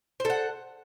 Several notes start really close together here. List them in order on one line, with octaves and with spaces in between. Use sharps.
C5 A4 F#5